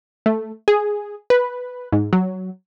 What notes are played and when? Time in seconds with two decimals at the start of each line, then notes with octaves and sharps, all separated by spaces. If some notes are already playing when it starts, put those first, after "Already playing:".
0.26 A3
0.68 G#4
1.30 B4
1.93 G#2
2.13 F#3